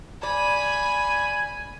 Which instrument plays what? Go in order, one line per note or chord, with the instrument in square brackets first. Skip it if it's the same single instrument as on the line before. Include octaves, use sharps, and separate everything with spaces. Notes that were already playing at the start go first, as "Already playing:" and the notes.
[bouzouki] D5 [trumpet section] G#5 [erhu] B5